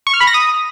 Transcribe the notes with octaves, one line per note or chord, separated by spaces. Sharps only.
C#6
F6
B5
A#6
D#6